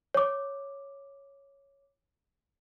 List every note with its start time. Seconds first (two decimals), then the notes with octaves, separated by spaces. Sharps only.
0.14 C#5 D6